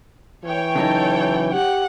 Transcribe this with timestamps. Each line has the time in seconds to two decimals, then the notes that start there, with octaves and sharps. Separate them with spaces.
0.44 E3 C#5 G5
0.75 C#3 F#3 D#4 A4
1.53 G4 F#5